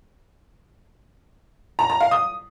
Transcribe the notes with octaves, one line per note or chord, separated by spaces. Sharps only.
A#5
A#5
F5
D#6